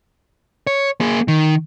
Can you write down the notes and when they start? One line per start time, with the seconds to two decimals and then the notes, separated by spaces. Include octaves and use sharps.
0.67 C#5
1.00 A#3 G#4
1.28 D#3